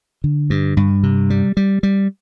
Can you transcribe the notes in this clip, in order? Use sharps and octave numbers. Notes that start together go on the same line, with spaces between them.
D3
G2
G2
C3
G3
G3
G3